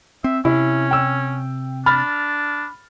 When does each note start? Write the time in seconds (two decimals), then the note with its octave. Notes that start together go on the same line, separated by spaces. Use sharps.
0.24 C4 E5
0.45 C3 C#4 E4
0.91 G5 E6
1.86 D4 B5 F6 A6